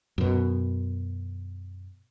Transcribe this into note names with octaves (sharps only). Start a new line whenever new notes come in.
F#2 B2